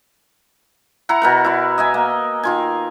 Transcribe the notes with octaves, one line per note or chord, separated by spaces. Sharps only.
E4 F#5 A#5
B2 A#4 F#5
E4 D5
D#5 E5 G#5
A#3
D#3 F4 G#5